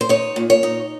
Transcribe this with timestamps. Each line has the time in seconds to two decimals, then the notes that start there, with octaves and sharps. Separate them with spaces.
0.01 C5
0.09 D#4 C#5
0.36 A#2
0.50 C#5
0.63 D#4